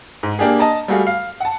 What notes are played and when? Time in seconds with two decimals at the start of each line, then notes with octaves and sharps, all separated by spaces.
0.23 G#2
0.39 A#3 D4 G4 G#4
0.59 D#5 A5 A#5
0.88 G3 A3 F#4 G#4 F5
1.07 F5
1.40 F#5 A5